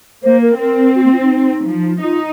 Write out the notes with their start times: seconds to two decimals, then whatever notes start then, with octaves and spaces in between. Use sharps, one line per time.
0.24 A#3 C5
0.42 A#4
0.59 C4 A#4
0.95 F#4
1.04 A#3
1.13 F4
1.21 D#4
1.66 F3
2.02 D#4 F4